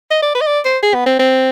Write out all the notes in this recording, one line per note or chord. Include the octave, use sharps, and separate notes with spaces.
D#5
D5
B4
D#5
D5
C5
G#4
B3
C4
C4